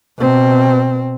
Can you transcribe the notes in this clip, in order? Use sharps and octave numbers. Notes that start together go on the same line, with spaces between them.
B2 C4